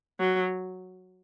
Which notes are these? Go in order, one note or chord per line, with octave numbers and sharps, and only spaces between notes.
F#3